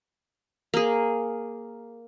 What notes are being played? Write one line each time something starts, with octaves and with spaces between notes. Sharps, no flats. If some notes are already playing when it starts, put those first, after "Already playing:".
A#3 G#4